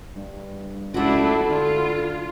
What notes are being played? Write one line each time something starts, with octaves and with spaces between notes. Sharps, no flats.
G2
C#2 A3 D4 E4 F#4 A4
D3 F4